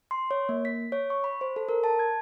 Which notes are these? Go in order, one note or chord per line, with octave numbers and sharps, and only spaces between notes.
C6
C#5
A#3
B6
C#5
C#6
B5
C5
A4
A#4
A5
G#6